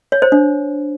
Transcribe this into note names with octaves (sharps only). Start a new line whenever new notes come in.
C#5
C5
D4